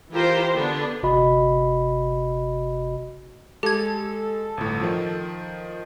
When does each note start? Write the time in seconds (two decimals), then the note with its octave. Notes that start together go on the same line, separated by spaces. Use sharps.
0.11 E3 F4 G4 A#4 C5
0.55 D3 B3 D4
1.03 G1 C3 F#4 D#5 B5
3.63 G#3 G4 A4 G#6
4.57 G1 A2
4.81 D#3 F3